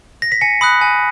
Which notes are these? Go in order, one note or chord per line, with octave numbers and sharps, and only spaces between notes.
A#6
B6
G#5 C#7
B5 D#6 F#6
G#5